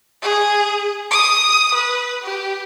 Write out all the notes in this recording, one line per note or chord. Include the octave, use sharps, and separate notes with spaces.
G#4
D#6
B4
G4